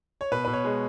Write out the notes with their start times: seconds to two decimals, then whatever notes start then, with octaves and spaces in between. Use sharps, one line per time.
0.21 C#5
0.32 B2 B4
0.45 B2 B4
0.53 C#5
0.64 G#3